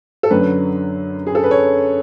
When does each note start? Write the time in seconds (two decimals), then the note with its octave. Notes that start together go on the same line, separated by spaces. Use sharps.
0.23 A4
0.30 F#2 D3 F#3 B4
1.27 G#4
1.35 A4
1.44 B4
1.51 C#5